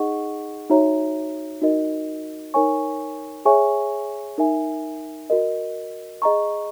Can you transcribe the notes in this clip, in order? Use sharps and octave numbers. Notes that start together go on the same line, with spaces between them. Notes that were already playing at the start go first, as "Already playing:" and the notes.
Already playing: D#4 G#4 D#5 F#5 C#6
D#4 F#4 C#5 E5 A#5
D#4 F#4 A#4 D#5
D#4 A#4 C#5 G#5 C#6
G#4 C#5 E5 G#5 C#6
D#4 A#4 E5 G#5
F#4 A#4 D#5
G#4 D#5 A#5 C#6